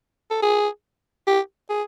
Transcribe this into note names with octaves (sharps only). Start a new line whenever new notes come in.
A4
G#4
G4
G#4